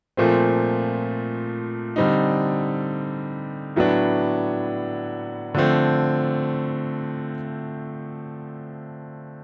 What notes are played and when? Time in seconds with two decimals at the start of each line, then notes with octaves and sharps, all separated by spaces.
0.17 A#2 F3 A3 C4
1.96 D3 G3 C4 D#4
3.76 A2 F#3 B3 D4
5.54 D3 F3 A3 C4